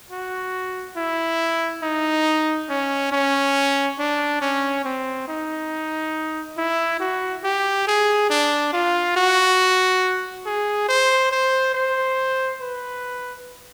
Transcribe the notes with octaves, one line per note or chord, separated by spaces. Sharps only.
F#4
E4
D#4
C#4
C#4
D4
C#4
C4
D#4
E4
F#4
G4
G#4
D4
F4
F#4
G#4
C5
C5
C5
B4